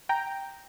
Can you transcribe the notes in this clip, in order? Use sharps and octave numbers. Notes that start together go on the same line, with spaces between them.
G5 A#5